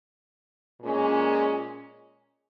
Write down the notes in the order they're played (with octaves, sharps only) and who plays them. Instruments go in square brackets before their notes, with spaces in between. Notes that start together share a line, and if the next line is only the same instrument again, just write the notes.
[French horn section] A#2 G#3 C#4